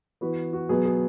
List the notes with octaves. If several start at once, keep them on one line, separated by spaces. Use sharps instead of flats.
E3 B3 F#4 B4
F#4
B2 F#3 B3 G#4
G#4